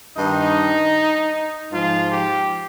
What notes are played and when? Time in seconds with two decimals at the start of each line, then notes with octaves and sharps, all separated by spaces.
0.16 G2 D#3 D#4
1.71 G#2 F3 F4
2.10 G4